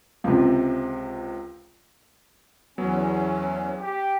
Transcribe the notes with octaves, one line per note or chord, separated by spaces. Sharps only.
C#2 C3
E2 F#3 B3 C#4
G4